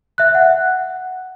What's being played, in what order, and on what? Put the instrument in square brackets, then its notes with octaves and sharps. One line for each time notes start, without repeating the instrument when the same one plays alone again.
[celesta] E5 F#6
F#5